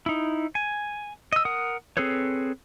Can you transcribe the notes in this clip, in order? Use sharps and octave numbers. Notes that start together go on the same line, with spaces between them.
D#4 E4
G#5
D#5 E6
A#4 F#5 D#6
C4 G#4 A4 B4 C#5